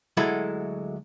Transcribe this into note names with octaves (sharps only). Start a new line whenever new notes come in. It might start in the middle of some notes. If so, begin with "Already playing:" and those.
D2 F#3 G#3 E4 A4 B5